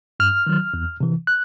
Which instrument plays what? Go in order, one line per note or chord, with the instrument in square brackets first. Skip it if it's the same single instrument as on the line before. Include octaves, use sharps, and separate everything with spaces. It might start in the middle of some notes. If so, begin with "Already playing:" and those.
[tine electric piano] G2 F6
D#3 F#3
E2
C3 E3
F#6